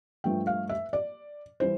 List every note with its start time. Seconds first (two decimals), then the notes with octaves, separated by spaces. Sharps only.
0.24 G2 F3 A3 G5
0.47 F5
0.69 E5
0.93 D5
1.60 E3 G3 C5